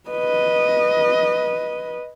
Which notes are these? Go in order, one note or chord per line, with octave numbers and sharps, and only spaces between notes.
B4 D#5